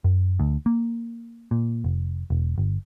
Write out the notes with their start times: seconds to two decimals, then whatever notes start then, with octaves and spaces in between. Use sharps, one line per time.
0.04 F#2
0.39 D2
0.66 A#3
1.51 A#2
1.84 F1
2.30 E1
2.58 G1